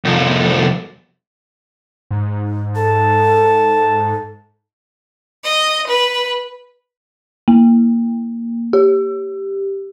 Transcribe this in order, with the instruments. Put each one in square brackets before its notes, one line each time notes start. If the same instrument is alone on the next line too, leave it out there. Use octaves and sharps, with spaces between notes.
[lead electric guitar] C2 F2
[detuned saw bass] G#2
[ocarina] A4 [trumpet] A5
[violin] D#5
B4
[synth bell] A#3
G4